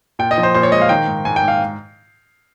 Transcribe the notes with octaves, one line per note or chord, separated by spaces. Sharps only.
A#2 G5
D#5
F3
C5
A#2 C5
C#5
G#3 D#5
F5
D#3 G5
G#2
G#2 G#5
G5
G#2
F5